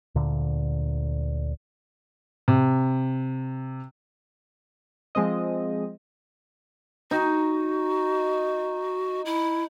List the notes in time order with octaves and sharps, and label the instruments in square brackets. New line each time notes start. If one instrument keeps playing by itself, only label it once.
[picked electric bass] D2 A#2 D3
[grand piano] C3
[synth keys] F3 G#3 C4 D#5
[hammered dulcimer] D#4 [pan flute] F#4
[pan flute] E4